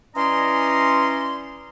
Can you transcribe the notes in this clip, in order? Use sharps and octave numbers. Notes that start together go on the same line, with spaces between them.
E3 C#4 D5 D#5 A#5 C6